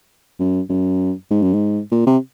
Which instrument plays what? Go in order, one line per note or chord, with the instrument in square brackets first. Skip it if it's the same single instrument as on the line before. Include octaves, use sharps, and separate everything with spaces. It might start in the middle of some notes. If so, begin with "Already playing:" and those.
[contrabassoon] F#2
F#2
G#2
F#2
G#2
A#2
C3